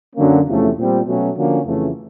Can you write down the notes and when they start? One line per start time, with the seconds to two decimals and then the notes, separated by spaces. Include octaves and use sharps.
0.16 F#2 D3 F#3 A#3 C#4
0.47 E2 C3 F3 A3 C#4
0.77 A#2 G3 C4
1.05 B2 F#3 A3 C#4 F#4
1.36 D3 F3 A#3 C#4 F#4
1.66 F2 C#3 E3 A3 C#4